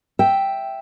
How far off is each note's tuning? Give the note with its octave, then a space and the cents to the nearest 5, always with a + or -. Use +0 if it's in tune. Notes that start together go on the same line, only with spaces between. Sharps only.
E5 +0 G5 +0